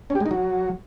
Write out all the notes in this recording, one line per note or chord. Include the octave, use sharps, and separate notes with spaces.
C#4
G4
G#3
D#4
F#3